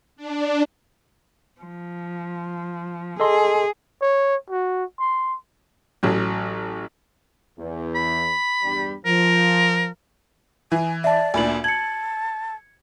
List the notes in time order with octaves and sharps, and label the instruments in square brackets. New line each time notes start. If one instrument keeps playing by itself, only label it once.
[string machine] D4
[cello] F3
[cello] G#4 [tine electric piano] A4 D#5 C6
[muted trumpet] C#5
F#4
C6
[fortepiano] A1 F#3
[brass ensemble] E2
[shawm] B5
[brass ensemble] E2 G2 G3
[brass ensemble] F3 [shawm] A#4
[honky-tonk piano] E3 [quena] G#5
[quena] D5 [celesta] E5 A5
[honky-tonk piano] D2 A#2 D4 [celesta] G#5 B5 F#7
[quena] A5 [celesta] G#6 C#7 [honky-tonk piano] F#7